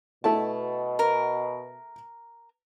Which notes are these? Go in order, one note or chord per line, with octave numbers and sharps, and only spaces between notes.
B2 A3 E4 A5
A#4